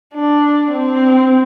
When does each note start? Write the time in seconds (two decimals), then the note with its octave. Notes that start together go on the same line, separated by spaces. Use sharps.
0.15 D4
0.72 C4